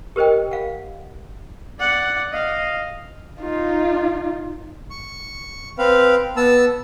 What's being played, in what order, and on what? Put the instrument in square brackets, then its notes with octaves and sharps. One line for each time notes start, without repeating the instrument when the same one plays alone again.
[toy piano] G4 A#4 C5 D#5 G5
F5 F#5
[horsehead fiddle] D5 F#5
D#5 F5
D#4 F4
[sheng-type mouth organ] C#6
C4 B4 F5
B3 A5 E6